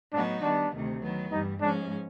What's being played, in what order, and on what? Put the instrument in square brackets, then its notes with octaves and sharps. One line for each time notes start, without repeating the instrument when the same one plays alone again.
[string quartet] A2 F#3 B3 D#4 F#4 [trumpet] D4
[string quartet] D#3 G3 B3 [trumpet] D4
[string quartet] D2 C3 D#3
D#3 F#3 B3
[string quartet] G2 E3 G3 [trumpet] D#4
[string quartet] G#2 F3 G#3 C#4 [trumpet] D4